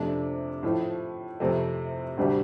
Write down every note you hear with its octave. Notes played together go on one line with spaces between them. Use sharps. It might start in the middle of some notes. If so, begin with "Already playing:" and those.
Already playing: F2 C3 A3 D4
A2 F3 A3
F2 C3 A3
D2 C3 G3 D4 G4